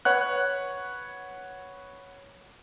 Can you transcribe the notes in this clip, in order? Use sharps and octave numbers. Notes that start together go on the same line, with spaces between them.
B4 C#5 F#5 F#6